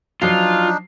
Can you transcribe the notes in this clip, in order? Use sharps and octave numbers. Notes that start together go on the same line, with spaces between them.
F3 F#3 D4 D#4 F4 C7